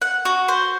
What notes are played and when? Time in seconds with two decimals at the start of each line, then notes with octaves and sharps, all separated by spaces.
0.02 F#5
0.25 F#4
0.48 C5